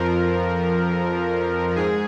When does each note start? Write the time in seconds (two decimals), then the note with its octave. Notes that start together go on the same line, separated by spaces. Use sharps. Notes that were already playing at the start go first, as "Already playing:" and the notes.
Already playing: F2 F3 A#4
1.76 G#2 G#4